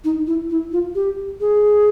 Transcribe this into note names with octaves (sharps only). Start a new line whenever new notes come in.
D#4
E4
E4
F4
G4
G#4